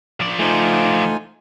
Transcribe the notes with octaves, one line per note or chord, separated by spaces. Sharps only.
F3 D5
A3 D#4 F4 C5 G#5